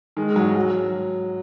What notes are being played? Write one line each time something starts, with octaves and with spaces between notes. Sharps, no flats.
D#3 G#3
G#2 F#3
F#3